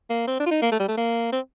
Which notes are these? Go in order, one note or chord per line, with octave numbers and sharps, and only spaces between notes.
A#3
C4
D4
F4
D#4
A#3
A3
G3
A3
A#3
C4